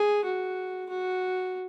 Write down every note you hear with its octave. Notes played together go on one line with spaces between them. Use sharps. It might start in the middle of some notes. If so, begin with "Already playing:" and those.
Already playing: G#4
F#4
F#4